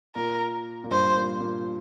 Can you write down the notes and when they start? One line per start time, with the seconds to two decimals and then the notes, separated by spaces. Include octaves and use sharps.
0.16 A#2 A#4
0.84 A#2
0.91 G2 C5
1.15 A#2
1.40 A#2